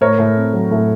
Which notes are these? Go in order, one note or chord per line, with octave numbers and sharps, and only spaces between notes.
A2 A#4 C#5
A2
C4
F#3
A2